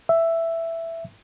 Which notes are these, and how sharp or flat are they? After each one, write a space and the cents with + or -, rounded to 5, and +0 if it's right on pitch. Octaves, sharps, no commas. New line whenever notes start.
E5 +5